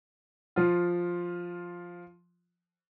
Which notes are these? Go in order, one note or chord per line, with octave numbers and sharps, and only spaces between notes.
F3 F4